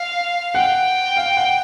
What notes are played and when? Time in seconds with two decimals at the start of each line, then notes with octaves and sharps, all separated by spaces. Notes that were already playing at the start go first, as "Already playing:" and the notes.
Already playing: F5
0.55 F#5 G5
1.17 F5
1.37 F#5